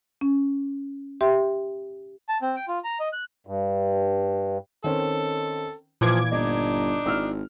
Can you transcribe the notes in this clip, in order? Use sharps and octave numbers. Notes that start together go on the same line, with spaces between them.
C#4
G4 E5 G5 C6
A5
C4
G5
F4
A#5
D#5
F#6
G2
D#3 C4 C#4 A4
A#2 E3 F3 B4 D6 G#6
G1 D4 D#4 D#5
G#1 E4 E6 F6